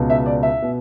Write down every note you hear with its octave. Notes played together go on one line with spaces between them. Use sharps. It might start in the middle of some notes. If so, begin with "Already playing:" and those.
Already playing: C#2 B2
E5
D5
E5
B2